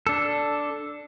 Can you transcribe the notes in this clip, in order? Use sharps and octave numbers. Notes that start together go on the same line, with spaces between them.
D4 A4